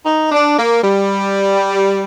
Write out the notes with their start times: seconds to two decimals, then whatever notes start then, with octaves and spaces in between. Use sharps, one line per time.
0.05 D#4
0.32 D4
0.58 A#3
0.84 G3